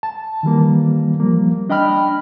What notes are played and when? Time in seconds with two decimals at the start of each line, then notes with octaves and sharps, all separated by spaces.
0.03 A5
0.43 D#3 E3 G3 A#3
1.20 F3 G3 A#3
1.69 D4 D#5 G5 B5 F6